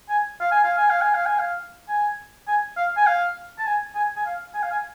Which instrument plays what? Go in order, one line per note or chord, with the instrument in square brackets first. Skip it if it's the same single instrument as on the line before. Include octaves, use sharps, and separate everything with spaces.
[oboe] G#5
F5
G#5
F5
G#5
F5
G#5
F5
G#5
F5
G#5
G#5
F5
G#5
F5
A5
G#5
G#5
G#5
F5
G#5
F5
G#5